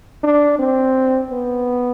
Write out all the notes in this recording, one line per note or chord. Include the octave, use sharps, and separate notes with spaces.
D4
C4
B3